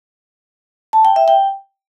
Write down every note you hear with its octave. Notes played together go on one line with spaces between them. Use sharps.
A5
G5
E5
G5